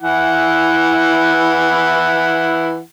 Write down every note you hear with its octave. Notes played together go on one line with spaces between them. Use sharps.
E3 E4 F#5